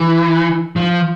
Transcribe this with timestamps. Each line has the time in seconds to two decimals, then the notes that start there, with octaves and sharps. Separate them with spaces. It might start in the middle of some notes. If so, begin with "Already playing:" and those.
Already playing: E3
0.76 F3